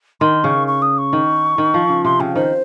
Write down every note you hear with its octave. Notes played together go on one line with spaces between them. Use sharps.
D#3 C6
C#3 C#6
C#6
D#6
C#6
D#3
D#3
F3
C#3
C3 C6
C#3 G5
D#3 C5